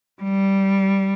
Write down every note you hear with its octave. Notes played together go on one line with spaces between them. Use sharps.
G3